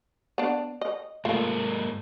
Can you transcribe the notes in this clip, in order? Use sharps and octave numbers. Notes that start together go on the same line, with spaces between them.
B3 D4
D#5
G#2 A3 A#3 F4